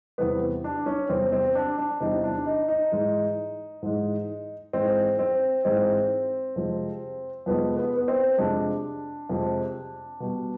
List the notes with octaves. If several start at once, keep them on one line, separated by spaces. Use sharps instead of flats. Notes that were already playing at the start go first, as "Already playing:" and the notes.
E2 C3 E3 G3 B3
D4
C#4
E2 C3 E3 G3 C4
C4
D4
D4
E2 C3 E3 G3 D#4
D4
D#4
D#4
G#2 E3 G#3
G#2 E3 G#3
G#2 E3 G#3 C4
C4
G#2 E3 G#3 C4
F2 C3 F3 G#3
F2 C3 F3 G#3 B3
B3
B3
C4
F2 C3 F3 G#3 D4
F2 C3 F3 G#3
B2 G3